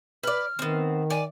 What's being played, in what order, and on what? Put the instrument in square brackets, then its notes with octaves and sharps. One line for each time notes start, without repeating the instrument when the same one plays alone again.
[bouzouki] B4 D5 [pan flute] F6
[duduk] D#3 [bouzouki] B3 C4
[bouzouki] D5 [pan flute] G#5